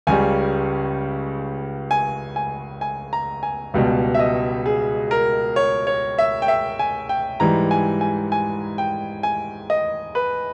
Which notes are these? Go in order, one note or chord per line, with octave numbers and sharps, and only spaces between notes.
C#2 C#3 G3 G#5
G#5
G#5
G#5
A#5
G#5
C#2 B2 G3
E5
D#5
G#4
A#4
C#5
C#5
E5
G5
E5
G#5
G5
G#2 E3 G3 A#5
G#5
G#5
G#5
G5
G#5
D#5
B4